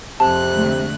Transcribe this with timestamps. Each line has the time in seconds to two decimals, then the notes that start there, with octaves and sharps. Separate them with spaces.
0.20 F2 C3 A5 F#6
0.54 D3 G#3 A3